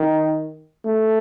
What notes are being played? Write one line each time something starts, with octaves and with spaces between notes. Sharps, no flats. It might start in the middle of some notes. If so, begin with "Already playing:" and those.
Already playing: D#3
A3